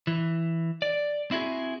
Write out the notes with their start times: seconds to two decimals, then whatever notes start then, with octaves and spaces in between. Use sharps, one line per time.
0.07 E3
0.82 D5
1.31 C4 E4 F#4 G#4